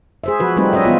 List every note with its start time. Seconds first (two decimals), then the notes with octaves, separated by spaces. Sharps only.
0.24 G#4 C5 E5
0.40 F3 F#4 B4
0.57 G3 A3 C4 D#4 B4
0.73 C#4 B4 C#5 D#5 E5
0.85 E3 B3 F4